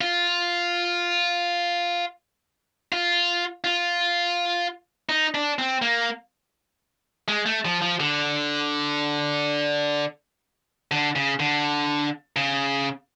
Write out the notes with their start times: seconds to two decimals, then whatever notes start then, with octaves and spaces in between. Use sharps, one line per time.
0.01 F4
2.92 F4
3.64 F4
5.09 D#4
5.35 D4
5.59 C4
5.82 A#3
7.28 G#3
7.46 A3
7.65 F3
7.82 F3
8.00 D3
10.91 D3
11.16 C#3
11.40 D3
12.36 C#3